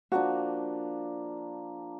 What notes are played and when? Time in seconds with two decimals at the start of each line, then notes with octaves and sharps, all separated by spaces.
0.12 F3 A#3 D4 F#4